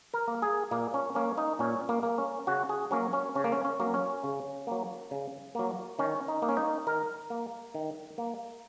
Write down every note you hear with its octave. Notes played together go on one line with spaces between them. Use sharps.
A#4
A#3
G#4
A#2 A#3
C#4
A#3 C#4
D#4
A#2 C#4
A#3
A#3
C#4
C#3 F#4
G#4
F#3 A#3 C#4
C#4
C#3 C#4
A#3
C#4
C#4
F#3 A#3
C#4
C#3
F#3 A#3
C#3
F#3 A#3
D#3 C#4
D#4
A#3
C#4
D#4
D#3 A#4
A#3
D#3
A#3